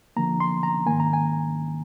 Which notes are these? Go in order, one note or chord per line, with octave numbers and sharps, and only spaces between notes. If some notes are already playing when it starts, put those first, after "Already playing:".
D3 F3 A#3 A#5
C6
A#5
G#2 D#3 A#3 G#5
A#5
G#5